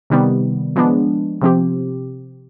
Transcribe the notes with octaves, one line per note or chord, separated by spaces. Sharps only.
C3 D#3 G3 B3
F3 G#3 B3 D4
C3 F3 C4 G4